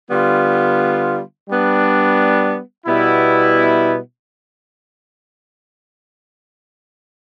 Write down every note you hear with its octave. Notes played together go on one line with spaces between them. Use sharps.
D3 G3 B3 F4
G3 B3 D4
B2 G3 B3 E4